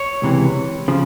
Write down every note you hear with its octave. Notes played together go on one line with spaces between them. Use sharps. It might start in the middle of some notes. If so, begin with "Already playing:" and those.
Already playing: C#5
C#2 C3 E3
C#3 F3